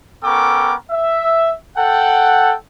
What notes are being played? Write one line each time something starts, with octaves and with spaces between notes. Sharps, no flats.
B3 C#4 A4 A#4 G5 D6
E5
A4 F#5 G5